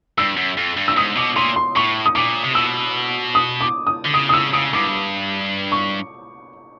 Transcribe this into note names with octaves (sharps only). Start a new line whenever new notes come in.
G2 E6
F#2
F2
G2
E6
G#2 D#6
B2 D6
A#2 C6
C6
A2 C#6
D#6
A#2 D6
C3
B2 E6
D#6
D6
D#6
D3
C#3 D#6
D#6
C#3 E6
C#3 D#6
G2 D6
C#6